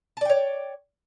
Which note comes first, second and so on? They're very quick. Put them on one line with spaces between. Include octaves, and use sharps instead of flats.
A5 D5 G5 C#5